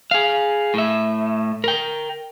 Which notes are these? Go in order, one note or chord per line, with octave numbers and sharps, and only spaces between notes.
G#4 F5
A2 E5
A#4 G5